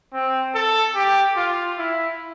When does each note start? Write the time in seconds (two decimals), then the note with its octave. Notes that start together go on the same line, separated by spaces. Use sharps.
0.13 C4
0.55 A4
0.96 G4
1.37 F4
1.79 E4